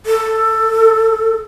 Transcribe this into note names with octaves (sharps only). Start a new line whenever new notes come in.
A4